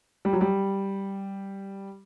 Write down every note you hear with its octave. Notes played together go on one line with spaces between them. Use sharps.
G3
F#3
G3